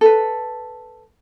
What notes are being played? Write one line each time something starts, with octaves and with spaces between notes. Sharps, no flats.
A4 B4